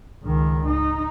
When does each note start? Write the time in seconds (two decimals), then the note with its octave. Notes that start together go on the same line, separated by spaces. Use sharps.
0.23 C#2 D#3
0.66 D#4